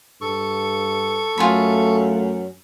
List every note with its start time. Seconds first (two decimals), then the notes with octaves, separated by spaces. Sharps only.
0.21 G2 A4 C#6
1.38 F#2 A3 F4 G#4 B5